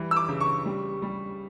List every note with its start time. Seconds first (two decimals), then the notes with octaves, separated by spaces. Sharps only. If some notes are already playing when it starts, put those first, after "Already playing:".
Already playing: E3 G3
0.11 E6
0.16 D6
0.29 C#3
0.40 C#6
0.66 G3
1.02 G3